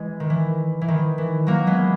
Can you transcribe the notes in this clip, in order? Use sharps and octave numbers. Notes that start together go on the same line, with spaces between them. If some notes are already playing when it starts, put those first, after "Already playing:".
Already playing: E3 G#3
D#3
E3
E3
D#3
E3
F#3 A#3
G#3 B3